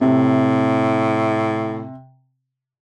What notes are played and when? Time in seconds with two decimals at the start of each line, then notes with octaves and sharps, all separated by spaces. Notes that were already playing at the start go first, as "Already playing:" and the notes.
0.01 A2 C3